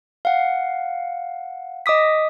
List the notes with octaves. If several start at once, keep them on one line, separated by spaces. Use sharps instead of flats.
F5 F#5
D#5 D6 D#6 B6